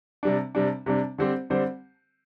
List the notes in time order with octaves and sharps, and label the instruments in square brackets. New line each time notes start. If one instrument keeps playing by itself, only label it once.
[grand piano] C3 G3 D4
C3 G3 D4
C3 G3 D4
D3 G3 C4 G4 C5
D3 G3 C4 G4 C5